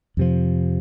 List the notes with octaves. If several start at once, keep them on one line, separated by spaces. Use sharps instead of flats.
F2 C3 F3